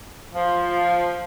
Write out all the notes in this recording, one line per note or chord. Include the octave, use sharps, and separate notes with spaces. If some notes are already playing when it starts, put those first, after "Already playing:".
F3